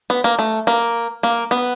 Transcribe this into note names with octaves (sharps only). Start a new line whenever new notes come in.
B3
A#3
A3
A#3
A#3
B3